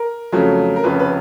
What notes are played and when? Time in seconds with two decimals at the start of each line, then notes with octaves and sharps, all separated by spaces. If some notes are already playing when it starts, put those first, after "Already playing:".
Already playing: A#4
0.32 F2 C#3 F#3 A3
0.76 A#4
0.83 F1 F2 C#3 B4
0.99 B4